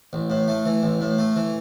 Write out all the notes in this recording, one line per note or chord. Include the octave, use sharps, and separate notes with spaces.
A1
A2
A3
E3
A1
A2
A3
E3